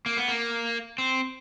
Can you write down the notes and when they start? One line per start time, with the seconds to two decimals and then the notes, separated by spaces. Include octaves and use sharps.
0.06 A#3
0.17 B3
0.28 A#3
0.98 C4